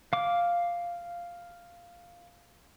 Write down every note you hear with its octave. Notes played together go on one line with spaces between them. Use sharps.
F5 D6